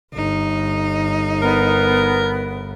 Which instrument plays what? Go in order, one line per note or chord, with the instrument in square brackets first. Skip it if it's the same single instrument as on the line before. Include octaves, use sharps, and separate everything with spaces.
[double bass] G1 [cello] D#4
[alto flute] B3 [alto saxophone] A#4